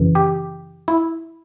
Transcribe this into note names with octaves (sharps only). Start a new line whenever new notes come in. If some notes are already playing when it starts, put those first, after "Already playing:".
Already playing: F#2 C#3 E3
G4
E4